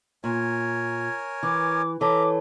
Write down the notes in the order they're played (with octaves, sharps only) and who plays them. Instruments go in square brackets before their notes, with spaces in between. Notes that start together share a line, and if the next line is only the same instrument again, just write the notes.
[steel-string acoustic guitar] A#2 [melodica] A#4 C#5 G#5
[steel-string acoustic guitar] E3 [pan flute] D6
[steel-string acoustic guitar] E3 [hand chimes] A4 C#5 A5 [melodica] E5 A#5 [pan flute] D6